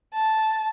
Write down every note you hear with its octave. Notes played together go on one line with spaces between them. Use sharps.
A5